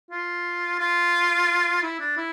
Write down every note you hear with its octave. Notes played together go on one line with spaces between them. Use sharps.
F4
F4
E4
D4
E4